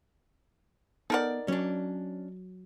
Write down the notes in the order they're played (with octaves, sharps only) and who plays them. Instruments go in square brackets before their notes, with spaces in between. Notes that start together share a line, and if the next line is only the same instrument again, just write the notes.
[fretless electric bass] B3 [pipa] D#4 A#4 D5 [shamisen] A4 F#5
[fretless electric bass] F#3 [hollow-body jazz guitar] C#4 D4